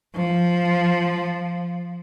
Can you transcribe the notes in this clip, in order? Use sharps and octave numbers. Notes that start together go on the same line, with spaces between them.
F3